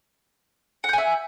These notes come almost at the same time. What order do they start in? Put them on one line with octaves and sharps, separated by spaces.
F#5 G6 G#5 E5